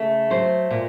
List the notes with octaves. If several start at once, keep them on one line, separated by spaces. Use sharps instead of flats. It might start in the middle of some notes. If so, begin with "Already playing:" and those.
Already playing: C#3 A3
F#3 C5
A#2